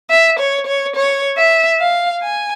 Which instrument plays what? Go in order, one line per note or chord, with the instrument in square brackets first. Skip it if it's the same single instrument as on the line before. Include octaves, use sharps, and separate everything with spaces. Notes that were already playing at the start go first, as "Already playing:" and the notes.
[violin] E5
C#5
C#5
C#5
E5
F5
G#5